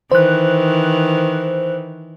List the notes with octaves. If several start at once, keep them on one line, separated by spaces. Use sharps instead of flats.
D#3 E3 C5 F#6